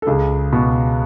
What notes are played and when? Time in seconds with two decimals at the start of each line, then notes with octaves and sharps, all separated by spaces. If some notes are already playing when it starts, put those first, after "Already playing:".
0.02 A4
0.07 C#2 G#4
0.53 B2